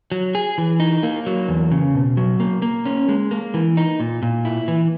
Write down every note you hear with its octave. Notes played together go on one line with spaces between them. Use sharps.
F#3
G#4
E3
D#4
A#3
F#3
E2
C#3
B2
F#3
A#3
A#3
C#4
G#3
A#3
E3
D#4
A#2
A#2
E4
E3